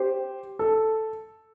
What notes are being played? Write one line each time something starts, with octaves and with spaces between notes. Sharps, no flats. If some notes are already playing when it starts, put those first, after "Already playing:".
Already playing: G4 C5
A4